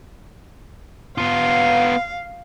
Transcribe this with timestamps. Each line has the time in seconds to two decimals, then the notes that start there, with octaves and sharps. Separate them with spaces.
1.18 B3 F4 F5